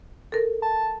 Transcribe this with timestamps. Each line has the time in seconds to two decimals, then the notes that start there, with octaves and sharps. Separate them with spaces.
0.32 A4 A#4
0.62 A5